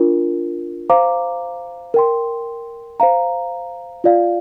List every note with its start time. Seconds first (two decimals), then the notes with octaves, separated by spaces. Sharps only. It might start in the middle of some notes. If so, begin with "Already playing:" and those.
Already playing: D4 F4 A#4
0.90 C5 F5 A#5 D6
1.94 A#4 G5 C6
3.00 C5 F5 A#5
4.04 F4 D5 F5